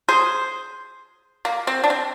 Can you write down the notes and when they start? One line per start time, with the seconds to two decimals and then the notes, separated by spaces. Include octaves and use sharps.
0.09 G#4 C5
1.45 A#3
1.67 C4
1.84 D4
1.90 C4